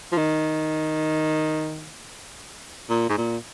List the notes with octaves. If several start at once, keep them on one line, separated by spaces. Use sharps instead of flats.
F3
D#3
A#2
G#2
A#2